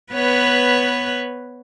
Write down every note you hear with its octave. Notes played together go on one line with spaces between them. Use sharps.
B3 B4 C#5